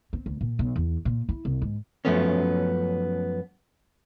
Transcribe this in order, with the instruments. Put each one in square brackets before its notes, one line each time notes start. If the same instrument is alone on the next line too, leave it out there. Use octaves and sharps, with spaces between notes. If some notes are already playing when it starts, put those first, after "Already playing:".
[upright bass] C4
D2
A#2
B1
E2
A#2
E4
C2
G#2
[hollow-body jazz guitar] F#2 C3 F3 A3 B3 C#4